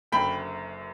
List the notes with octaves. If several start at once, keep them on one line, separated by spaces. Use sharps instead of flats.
F#1 F#2 D3 G5 B5